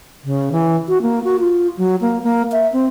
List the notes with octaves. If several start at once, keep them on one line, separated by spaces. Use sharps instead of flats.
C#3
E3
F#4
A#3
F#4
F4
F#3
A#3
A#3
E5
C4